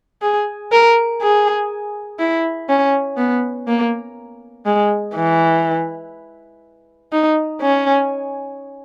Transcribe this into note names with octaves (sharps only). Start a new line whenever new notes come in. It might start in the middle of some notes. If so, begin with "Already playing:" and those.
G#4
A#4
G#4
E4
C#4
B3
A#3
G#3
E3
D#4
C#4